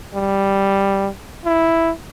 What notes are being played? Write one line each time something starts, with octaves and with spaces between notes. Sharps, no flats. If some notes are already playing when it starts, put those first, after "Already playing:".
G3
E4